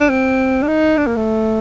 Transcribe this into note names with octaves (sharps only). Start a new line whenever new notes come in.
D4
C4
D4
D#4
D4
A#3
A3